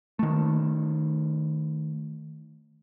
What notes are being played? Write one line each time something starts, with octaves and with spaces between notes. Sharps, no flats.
D#3 A3